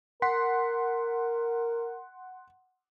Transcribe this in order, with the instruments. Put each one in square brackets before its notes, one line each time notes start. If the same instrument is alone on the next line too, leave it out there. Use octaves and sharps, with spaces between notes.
[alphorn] A#4 [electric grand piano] F#5 C6 B6